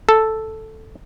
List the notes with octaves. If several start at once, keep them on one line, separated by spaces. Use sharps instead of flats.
A4